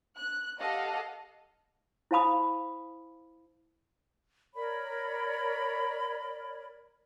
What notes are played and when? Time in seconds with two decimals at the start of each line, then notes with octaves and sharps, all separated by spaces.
0.15 F#6
0.60 G4 A4 D#5 F5 F#5
2.11 E4 C5 F5 A5 B5 D#6
4.54 A#4 C#5 D5 B5